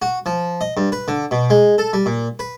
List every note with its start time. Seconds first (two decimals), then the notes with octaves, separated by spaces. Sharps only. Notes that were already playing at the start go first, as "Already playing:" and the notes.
0.02 F#4
0.26 F3
0.61 D#5
0.77 G2
0.92 B4
1.08 D3
1.31 B2
1.50 G#3
1.78 A4
1.93 G3
2.06 A#2
2.39 B4